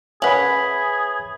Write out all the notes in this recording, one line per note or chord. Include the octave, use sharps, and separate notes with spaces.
C#4 G#4 B4 E5 F#5 B5 B6 F#7